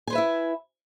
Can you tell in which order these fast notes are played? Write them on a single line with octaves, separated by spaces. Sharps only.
G#5 C5 B4 E5 E4